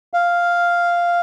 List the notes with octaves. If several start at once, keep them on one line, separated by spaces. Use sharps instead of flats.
F5